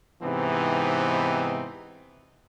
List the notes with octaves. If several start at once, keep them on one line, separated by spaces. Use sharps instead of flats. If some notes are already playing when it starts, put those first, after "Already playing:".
G#2 C3 E3 B3 C4 D#4